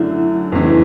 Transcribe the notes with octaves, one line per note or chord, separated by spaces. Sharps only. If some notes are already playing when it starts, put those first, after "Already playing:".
Already playing: F#2 D3 F#3 A3 D4 E4
F1 E2 C#3 E3